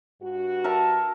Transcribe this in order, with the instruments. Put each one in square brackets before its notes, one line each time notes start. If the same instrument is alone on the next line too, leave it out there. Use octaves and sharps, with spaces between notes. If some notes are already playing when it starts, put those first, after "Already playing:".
[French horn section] G2 F#4
[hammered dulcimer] A#4 E5 A5